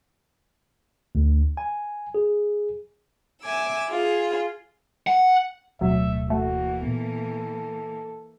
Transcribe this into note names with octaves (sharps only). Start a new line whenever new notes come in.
D2
G#5
G#4
E5 G#5 D6 E6
F4 G#4
F#5
D1 B2 F#3 A3 C4 E5
E3 A3 A#3 F#4
A#2 B3 A4